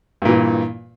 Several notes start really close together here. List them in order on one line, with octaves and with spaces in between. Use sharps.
G2 A#2 E3